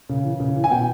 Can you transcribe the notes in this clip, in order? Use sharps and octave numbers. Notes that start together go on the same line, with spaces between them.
C#3
E3
C#3
E3
G#5
B2 G5